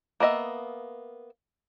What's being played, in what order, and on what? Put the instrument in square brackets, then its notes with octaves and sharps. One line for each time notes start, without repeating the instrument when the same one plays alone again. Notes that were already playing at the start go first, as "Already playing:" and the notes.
[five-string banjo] A#3 B3 D#5 E5